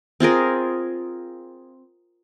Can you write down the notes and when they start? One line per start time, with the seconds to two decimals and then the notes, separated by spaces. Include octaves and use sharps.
0.20 C4 F4 G#4 A#4